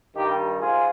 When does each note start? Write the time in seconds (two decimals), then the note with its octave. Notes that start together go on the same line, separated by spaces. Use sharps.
0.15 G2 D#3 G3 D#4 G4
0.60 G#2 F4 G#4